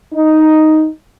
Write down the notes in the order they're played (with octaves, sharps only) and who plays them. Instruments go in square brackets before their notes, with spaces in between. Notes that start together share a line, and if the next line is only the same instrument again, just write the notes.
[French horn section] D#4